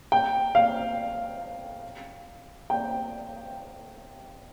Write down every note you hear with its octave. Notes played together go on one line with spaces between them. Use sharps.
G5
F5
G5